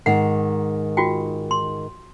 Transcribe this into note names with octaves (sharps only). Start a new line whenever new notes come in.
G#2 D#3 F#5
F4 F#4 G5
C6